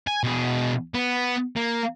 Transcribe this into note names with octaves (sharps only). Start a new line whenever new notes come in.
G#5
B2 G#4
B3
A#3